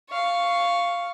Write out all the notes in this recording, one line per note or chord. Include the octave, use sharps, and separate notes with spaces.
F5 C#6